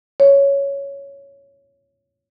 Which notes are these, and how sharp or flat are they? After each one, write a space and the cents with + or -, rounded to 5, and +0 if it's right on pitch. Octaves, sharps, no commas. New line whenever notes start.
C#5 +5